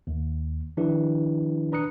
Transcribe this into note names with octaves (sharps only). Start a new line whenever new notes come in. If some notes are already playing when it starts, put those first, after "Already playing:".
D#2
D#3 F3 D4 E4 G4 B4
D4 B4 A#5 D#6 F#6 C#7